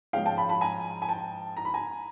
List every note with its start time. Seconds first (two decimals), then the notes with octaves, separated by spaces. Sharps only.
0.13 G#2 F3 G#3 C#4 F5 G5
0.26 G5 A5
0.37 A5 B5
0.49 A5 B5
0.61 G#5 A#5
1.02 G#5
1.09 G5 A5
1.57 A#5
1.65 B5
1.74 G#5 A#5